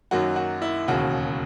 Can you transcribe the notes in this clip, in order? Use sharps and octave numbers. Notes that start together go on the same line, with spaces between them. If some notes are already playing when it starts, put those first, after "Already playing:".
F#2 D#3 F#3 A#3 F#4
F#4
E4
E1 D#2 C#3 F#4